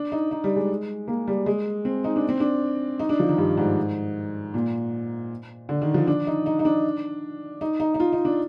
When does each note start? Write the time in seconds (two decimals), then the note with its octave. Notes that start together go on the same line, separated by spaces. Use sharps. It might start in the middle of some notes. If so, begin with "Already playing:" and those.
Already playing: D4
0.12 D#4
0.31 D#4
0.44 G3
0.56 G#3
1.08 A#3
1.28 G3
1.46 G#3
1.85 C4
2.04 D#4
2.16 D4
2.29 C4
2.40 D4
3.00 D#4
3.09 D4
3.19 F3
3.29 D#3
3.38 G2
3.57 G#2
4.54 A#2
5.69 D3
5.82 D#3
5.94 F3
6.07 D4
6.27 D#4
6.46 D#4
6.59 D#4
6.65 D4
7.61 D#4
7.80 D#4
7.94 D#4
8.00 F4
8.13 D#4
8.25 D4